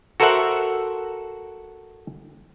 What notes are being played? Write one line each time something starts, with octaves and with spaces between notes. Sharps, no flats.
F#4 A4 A#4 C5 E5 F#5